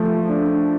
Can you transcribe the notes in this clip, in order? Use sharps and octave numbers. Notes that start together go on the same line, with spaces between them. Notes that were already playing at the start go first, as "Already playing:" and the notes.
Already playing: F3 A3
D4